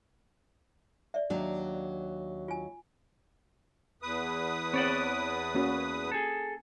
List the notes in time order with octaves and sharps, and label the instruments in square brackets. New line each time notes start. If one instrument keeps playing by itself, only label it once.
[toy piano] D5 E5
[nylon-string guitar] D#2 F#3 D4
[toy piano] F4 G#5
[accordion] E2 B4 D#6
[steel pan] C4 [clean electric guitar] C#5 D5 F#5
[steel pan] A#3 C#4 F#4
[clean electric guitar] G#4 A4